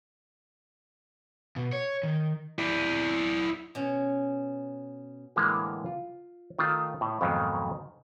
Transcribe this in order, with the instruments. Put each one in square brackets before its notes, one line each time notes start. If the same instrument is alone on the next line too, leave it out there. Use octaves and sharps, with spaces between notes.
[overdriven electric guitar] B2
C#5
D#3
[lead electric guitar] E4 D5
[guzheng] B2 C#4
[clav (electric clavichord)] A2 D3 E3 G#3 A#3
F4
D#3 A3 F4
A2
F2 G#2 B2 D#3 F#3